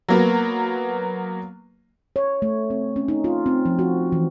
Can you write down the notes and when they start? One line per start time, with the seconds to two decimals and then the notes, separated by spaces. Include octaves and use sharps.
0.08 F#3 A#3 B3
2.16 C#5
2.42 A3
2.70 C4
2.96 C#4
3.08 D#4
3.24 F4
3.46 C4
3.65 F3
3.79 F#4
4.12 E3